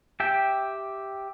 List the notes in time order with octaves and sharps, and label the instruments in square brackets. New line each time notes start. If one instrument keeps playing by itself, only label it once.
[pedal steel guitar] G4 E5 G5